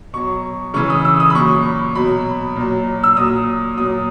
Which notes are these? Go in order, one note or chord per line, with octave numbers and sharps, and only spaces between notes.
B2 F#3 C#6
C#3 E3 C#6
D#6
E6
D#6
B5
A#2 F#3 C#6
B2 F#3 B5
A#2 F#3
E6
A#2 F#3 D#6
A#2 F#3 D#6